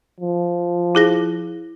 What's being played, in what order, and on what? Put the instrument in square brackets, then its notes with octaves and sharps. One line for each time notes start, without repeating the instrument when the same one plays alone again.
[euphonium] F3
[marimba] E4 G#4 A#6